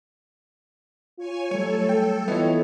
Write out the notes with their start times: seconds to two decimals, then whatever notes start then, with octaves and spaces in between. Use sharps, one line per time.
1.18 F4 C#5 G#5
1.51 F#3 G3 A3 A4 C#5
1.89 G5
2.28 E3 B3 F4 C#5 D#5 E5